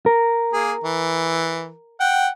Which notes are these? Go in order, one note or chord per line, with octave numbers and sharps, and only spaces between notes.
A#4
A#3 G#4
E3
F#5 G5